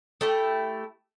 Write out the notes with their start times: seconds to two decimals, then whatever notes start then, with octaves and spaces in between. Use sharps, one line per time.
0.21 A3 E4 G4